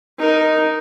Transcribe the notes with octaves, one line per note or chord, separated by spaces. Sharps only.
D#4 A#4